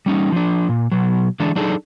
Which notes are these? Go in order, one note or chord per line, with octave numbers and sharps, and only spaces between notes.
G3 C#4 D#4
F3 D4
A#2
B2 F#3
D3 E3 G#3 D4
F#3 D4 D#4 G#4 A4